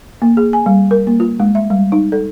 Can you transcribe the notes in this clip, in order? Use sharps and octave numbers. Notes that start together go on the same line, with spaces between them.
A#3
G#4
G#5
G3
A#4
A#3
F4
G#3
E5
G3
D#4
A4